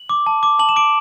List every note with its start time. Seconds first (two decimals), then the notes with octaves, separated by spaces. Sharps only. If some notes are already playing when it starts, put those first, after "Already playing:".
Already playing: F#7
0.09 D6
0.26 A5
0.43 D6
0.59 A5 F#7
0.69 E7
0.76 D6 D7